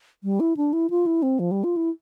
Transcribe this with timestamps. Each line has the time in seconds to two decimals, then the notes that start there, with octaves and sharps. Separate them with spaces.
0.24 G3
0.40 E4
0.57 D4
0.73 E4
0.90 F4
1.06 E4
1.23 C4
1.39 F3
1.51 G3
1.64 F4
1.77 E4